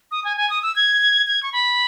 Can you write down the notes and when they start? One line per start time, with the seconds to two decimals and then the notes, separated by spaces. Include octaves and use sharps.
0.11 D#6
0.25 G#5
0.37 G#5
0.50 D#6
0.63 E6
0.76 G#6
1.27 G#6
1.43 C#6
1.53 B5